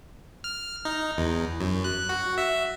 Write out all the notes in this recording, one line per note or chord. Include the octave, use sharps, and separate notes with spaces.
F6
D#4
E2
F#2
F#6
F#4
E5